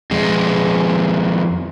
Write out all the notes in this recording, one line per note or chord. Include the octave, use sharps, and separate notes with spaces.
F2 G#3